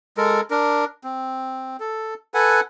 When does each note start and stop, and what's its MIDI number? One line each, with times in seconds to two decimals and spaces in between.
0.17 0.41 56
0.17 0.41 69
0.17 0.41 70
0.51 0.85 62
0.51 0.85 70
1.04 1.77 60
1.80 2.14 69
2.34 2.60 69
2.34 2.60 71
2.34 2.60 78
2.34 2.60 80